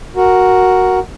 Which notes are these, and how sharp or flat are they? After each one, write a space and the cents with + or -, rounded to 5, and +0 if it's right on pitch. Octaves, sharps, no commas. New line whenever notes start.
F#4 +0 A#4 +0